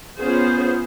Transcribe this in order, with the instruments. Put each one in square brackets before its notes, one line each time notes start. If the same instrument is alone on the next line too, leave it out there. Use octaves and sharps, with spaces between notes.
[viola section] B3 C#4 F4 G#4 C5